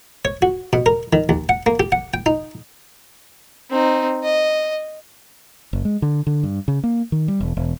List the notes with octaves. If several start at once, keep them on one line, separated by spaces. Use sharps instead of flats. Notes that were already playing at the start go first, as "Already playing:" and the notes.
C#5
F#4
B2
A#4
D#3
D#2
F#5
A#3
G4
F#5
G5
D#4
C4 D#4
D#5
F#1
G#3
D3
D3
G2
C#3
A#3
D#3
G3
E1
E1